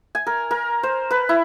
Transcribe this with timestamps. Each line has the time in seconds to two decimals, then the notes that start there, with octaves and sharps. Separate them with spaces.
0.15 G#5
0.27 A#4
0.51 A#4
0.83 C5
1.11 B4
1.29 E4